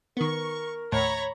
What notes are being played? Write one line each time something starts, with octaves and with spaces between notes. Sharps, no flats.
D#3 B3 A#4 C#6
D#2 A2 C#5 A#5 B5